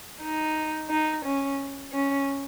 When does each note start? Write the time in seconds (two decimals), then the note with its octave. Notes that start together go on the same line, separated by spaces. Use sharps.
0.22 D#4
0.90 D#4
1.25 C#4
1.93 C#4